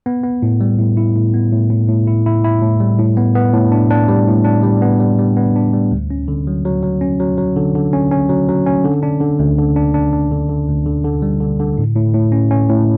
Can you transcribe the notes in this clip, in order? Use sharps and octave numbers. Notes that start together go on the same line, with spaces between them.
B3
B3
A2
G3
A2
E4
A2
B3
A2
A2
A2
E4
E4
E4
A2
G3
A2
B3
B3
A2
D4
D4
G3
A2
D4
G3
B3
G3
G3
B3
D4
G3
D2
C#4
D3
F#3
F#3
F#3
C#4
F#3
F#3
D3
D3
C#4
C#4
F#3
F#3
C#4
D3
D4
D3
D2
D3
D4
D4
D4
D3
D3
D2
D3
D3
G3
D3
D3
A2
A2
A2
C#4
C#4
A2